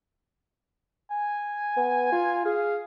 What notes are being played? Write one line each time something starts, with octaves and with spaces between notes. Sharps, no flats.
G#5
B3
F4
G#4 F5